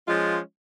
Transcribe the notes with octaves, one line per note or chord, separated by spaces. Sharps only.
F3 G#3 C#4 F4